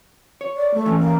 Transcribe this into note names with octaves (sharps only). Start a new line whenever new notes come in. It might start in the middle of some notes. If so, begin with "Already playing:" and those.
C#5
D5
A3
E3 C#4
A#3